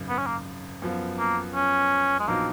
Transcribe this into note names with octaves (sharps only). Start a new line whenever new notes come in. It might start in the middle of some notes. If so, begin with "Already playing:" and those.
Already playing: G#1 F#2 C#3
B3
C#4
A#3
F#2 F3 B3
A#3
C#4
G#3
A#1 A#2 F#3 A#3 B3 D#4